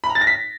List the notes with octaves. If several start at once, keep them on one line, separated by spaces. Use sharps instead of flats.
B5
A#5
A6
A#6
B6